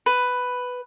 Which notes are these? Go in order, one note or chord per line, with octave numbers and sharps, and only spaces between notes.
B4